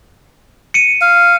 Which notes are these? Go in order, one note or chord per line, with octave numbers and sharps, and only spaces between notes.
C#7 D#7
F5